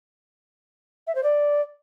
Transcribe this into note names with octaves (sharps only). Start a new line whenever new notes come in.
E5
C5
D5